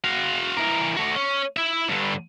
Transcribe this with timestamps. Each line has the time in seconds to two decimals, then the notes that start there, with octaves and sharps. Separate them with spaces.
0.04 F#4 F5
0.57 E3 A#4
0.97 A3 F#4
1.15 C#4
1.57 E4 E5
1.89 G2 D3